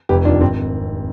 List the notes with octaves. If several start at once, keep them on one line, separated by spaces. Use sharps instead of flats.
F1 G4 B4
D#2 D#3 D4 F4
G#1 C4